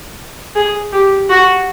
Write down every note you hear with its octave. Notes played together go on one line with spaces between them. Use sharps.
G#4
G4
F#4